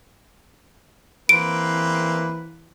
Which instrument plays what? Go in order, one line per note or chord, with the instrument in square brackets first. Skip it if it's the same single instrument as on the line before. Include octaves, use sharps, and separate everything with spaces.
[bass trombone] E3 [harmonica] A#3 C4 B4 [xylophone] D7